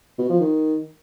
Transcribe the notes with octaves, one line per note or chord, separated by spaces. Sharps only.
B2
F3
D#3